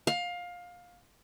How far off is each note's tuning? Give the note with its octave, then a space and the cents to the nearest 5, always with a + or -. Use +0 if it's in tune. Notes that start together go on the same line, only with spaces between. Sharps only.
F5 +20